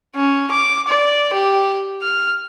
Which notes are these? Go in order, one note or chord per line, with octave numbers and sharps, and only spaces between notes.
C#4
D6
D5
G4
F6